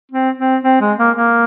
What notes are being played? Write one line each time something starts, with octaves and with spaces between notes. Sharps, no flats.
C4
C4
C4
G#3
A#3
A#3